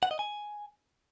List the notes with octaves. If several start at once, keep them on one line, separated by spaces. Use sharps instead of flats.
F#5
D#5
G#5